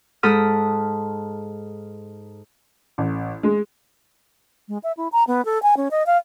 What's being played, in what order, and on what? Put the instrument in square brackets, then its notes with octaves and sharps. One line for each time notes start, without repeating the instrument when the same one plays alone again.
[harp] G#2 A4 B5 D#6 F6
[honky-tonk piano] A1
G#3
[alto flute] G#3
E5
E4
A#5
B3
A4
G#5
C#4
D#5
F5